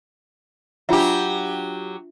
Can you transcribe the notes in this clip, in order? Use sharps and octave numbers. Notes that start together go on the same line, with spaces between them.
F#3 D4 F4 G4 E5